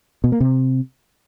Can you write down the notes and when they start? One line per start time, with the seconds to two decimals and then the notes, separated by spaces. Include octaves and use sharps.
0.24 B2
0.32 A#3
0.40 C3